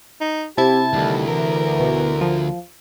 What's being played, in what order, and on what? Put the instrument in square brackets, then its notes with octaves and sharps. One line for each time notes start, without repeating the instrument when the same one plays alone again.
[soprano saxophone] D#4
[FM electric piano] C3 E4 G#6 [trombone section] C4 G4 [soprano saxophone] A5
[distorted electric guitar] D2 [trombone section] D#3 G3 A3
[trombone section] E3 [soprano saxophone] A#4
[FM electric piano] B2
F3